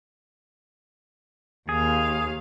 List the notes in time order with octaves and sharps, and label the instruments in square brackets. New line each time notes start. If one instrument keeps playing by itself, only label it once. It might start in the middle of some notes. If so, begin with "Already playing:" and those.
[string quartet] D#2 F5 [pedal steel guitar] G#4